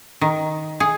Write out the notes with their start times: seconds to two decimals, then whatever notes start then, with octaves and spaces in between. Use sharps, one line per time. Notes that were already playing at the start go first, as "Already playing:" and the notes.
0.21 D#3
0.80 G#4